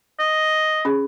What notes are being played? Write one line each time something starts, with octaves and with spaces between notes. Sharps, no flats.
D#5
C#4 G#4